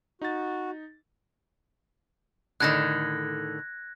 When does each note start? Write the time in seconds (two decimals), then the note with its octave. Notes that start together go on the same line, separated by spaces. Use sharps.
0.22 D#4 F#4 A6
2.60 A2 D3 D#3 F#6 G#6 A#6